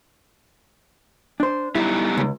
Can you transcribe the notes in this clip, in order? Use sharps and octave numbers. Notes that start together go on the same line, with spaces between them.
D4 C5
G3 B3 D#4 E4
C#2